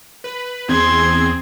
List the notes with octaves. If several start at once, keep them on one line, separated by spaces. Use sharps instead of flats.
B4
E2 C4 G#4 C6 G#6